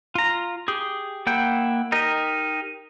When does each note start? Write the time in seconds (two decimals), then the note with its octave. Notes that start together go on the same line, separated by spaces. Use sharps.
0.15 F4 A#5
0.68 G4 G#4
1.27 A#3 E4 F#5 G5 G6
1.92 D#4 G4 A#4 D#5